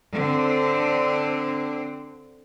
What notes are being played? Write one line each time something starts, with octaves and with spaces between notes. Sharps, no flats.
D3 C4